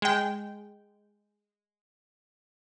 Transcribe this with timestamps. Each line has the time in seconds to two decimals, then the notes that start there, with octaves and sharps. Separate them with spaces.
0.02 G#3 G5